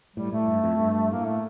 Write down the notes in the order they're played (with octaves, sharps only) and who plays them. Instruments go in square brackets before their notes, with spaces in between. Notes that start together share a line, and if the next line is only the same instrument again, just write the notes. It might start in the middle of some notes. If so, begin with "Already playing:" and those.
[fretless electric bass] A2 [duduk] G3
[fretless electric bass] A2 [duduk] A3
[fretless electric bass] G2
F2
G2
[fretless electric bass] A2 [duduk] A#3
[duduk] A3